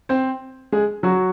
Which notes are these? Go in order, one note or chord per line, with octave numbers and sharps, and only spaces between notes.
C4 C5
G#3 G#4
F#3 F#4